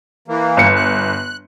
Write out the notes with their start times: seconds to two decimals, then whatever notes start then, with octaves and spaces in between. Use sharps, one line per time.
0.28 E3 A#3
0.57 G1 C#7
0.76 F#6